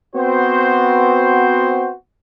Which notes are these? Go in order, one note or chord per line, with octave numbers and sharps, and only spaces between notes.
B3 C4 F#4 C5